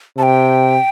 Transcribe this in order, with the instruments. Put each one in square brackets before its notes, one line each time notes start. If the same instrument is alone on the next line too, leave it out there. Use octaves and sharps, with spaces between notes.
[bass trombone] C3 [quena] A5
[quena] G5